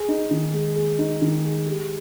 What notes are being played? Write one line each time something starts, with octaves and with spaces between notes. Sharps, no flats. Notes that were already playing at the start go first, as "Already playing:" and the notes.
Already playing: G#4
D#4
D#3
G#3
G#4
D#4
D#3
G#3
G4